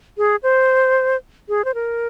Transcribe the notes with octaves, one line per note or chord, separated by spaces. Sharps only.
G#4
C5
G#4
C5
A#4